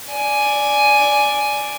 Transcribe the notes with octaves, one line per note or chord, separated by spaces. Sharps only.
D5 G#5